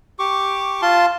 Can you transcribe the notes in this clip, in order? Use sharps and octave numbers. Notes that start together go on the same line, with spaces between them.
G4 C#6 D6
F4 A5 C6